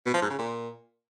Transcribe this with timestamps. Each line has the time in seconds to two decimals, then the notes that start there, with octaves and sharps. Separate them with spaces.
0.06 B2
0.14 F3
0.22 G#2
0.31 C#3
0.39 A#2